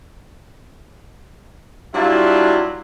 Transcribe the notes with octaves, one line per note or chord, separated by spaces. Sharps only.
F#3 G3 D4 E4 F4 E5